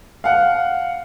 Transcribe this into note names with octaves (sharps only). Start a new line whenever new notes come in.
F5 F#5